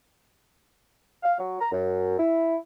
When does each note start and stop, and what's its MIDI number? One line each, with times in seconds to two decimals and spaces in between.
1.23 1.33 77
1.38 1.56 54
1.60 1.68 82
1.71 2.14 42
2.19 2.57 64